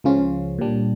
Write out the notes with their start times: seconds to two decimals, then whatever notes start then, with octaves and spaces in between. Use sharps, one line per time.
0.04 C#2 C#3 F3 C#4 F4
0.59 A#2 G3 D4